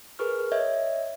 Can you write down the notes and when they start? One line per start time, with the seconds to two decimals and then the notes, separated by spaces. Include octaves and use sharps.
0.19 G#4 A#4 B4 C#6 F6
0.52 C#5 D#5 E5 G#6